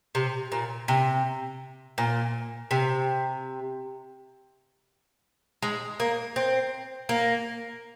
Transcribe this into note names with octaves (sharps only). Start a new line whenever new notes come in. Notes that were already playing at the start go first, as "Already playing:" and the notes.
C3
A#2
C3
A#2
C3
G#3
A#3
C4
A#3